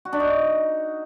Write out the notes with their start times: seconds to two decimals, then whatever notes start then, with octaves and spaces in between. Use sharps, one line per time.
0.05 F#4
0.13 D4
0.20 D#4